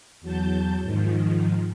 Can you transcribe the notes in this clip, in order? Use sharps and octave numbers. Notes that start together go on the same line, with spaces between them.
E2 F#3 A5 G6
G#2 D#3 F3